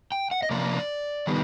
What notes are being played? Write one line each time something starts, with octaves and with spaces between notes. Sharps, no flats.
G5
F#5
D#5
C3 F3 A#3 D5
D#3 G3 B3